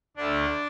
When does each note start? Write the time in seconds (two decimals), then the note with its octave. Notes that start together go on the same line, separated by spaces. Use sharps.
0.17 D2 D3 A3 D4 D5